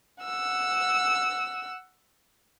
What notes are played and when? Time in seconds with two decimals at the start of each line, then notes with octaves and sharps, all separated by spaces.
0.24 F#5 E6